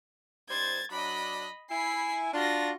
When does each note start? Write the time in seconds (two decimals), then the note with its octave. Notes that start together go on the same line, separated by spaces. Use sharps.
0.50 G3 D#4 C5 G#6 A6
0.91 F#3 D4 D#5 B5
1.70 E4 G#5 B5 C7
2.33 D4 F4 F#4 A#6